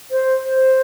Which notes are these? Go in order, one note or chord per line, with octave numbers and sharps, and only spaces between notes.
C5
C5